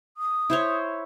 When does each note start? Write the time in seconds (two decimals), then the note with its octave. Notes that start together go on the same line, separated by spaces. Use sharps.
0.17 D#6
0.50 E4 C5 C#5